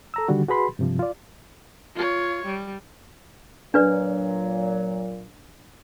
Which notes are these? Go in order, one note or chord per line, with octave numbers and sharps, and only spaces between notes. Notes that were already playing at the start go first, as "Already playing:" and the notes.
A4 A#5 E6
D3 D#3 G3 F#4
F#4 G#4 B4 B5 C6
G2 C3 F3
F4 D5
F4 C#5
G3
A#2 F#3 D4 B4 D5